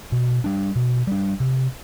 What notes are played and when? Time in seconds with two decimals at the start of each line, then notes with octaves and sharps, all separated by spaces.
0.12 B2
0.44 G3 D4
0.76 B2
1.07 G3 D4
1.40 C3